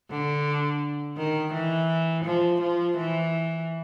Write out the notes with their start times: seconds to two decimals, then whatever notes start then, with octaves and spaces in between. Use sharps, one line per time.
0.10 D3
1.17 D#3
1.53 E3
2.24 F3
2.61 F3
2.97 E3